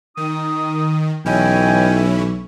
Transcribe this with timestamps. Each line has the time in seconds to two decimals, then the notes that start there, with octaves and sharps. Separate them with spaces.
0.17 D#3 D#4 D#6
1.25 B1 E3 C#4 E4 D#5 G5 G#5